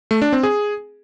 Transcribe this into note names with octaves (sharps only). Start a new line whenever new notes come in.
A3
D4
C4
G#4